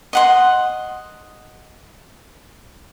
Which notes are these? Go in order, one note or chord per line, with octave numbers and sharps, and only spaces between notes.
D#5 F#5 C6